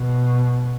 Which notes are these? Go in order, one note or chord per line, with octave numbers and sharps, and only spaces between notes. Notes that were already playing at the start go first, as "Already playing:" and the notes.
Already playing: B2